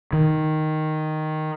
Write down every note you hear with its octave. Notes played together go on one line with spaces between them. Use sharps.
D#3